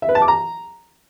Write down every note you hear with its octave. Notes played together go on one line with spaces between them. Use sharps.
E5
B4
A5
D6
A#5